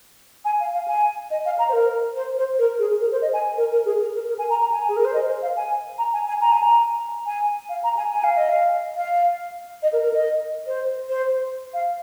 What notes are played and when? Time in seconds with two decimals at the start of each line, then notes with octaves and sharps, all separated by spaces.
0.45 G#5
0.60 F5
0.74 F5
0.88 G#5
1.31 D#5
1.45 F5
1.59 A#5
1.69 C5
1.73 A#4
2.16 C5
2.37 C5
2.58 A#4
2.79 G#4
3.00 A#4
3.12 C5
3.22 D#5
3.33 G#5
3.57 A#4
3.72 A#4
3.85 G#4
4.00 A#4
4.15 A#4
4.29 A#4
4.39 G#5
4.50 A#5
4.61 A#5
4.72 G#5
4.89 G#4
4.97 A#4
5.05 C5
5.14 D#5
5.28 C5
5.42 F5
5.57 G#5
5.98 A#5
6.13 G#5
6.28 G#5
6.41 A#5
6.52 G#5
6.63 A#5
7.26 G#5
7.69 F5
7.84 A#5
7.97 G#5
8.12 G#5
8.24 F5
8.37 D#5
8.49 F5
8.97 F5
9.83 D#5
9.93 A#4
10.03 A#4
10.13 D#5
10.67 C5
11.09 C5
11.74 F5